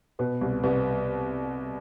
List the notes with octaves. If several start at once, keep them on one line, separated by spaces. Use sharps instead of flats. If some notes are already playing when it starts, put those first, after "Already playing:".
B2 B3
C2
C2 B3